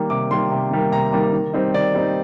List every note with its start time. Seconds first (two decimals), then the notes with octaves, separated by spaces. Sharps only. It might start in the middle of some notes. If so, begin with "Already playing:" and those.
Already playing: D#3 G3 A#3
0.10 C3 D6
0.31 D#3 G3 A#3 C6
0.51 C3
0.71 D#3 G3 A#3
0.92 C3 A#5
1.12 D#3 G3 A#3
1.33 D#3
1.53 G3 C4 D#4
1.74 D#3 D5
1.94 G3 C4 D#4